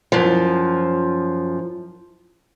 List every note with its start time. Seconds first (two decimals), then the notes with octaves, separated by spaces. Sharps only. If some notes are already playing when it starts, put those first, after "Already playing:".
0.12 F#2 F3